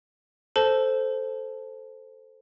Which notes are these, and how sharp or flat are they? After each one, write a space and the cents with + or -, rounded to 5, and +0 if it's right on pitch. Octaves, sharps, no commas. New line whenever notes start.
A4 +0 C5 +0 A5 -10